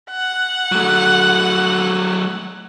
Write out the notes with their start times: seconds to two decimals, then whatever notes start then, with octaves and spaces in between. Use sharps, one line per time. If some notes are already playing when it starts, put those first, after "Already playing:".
0.10 F#5
0.72 F#3 A3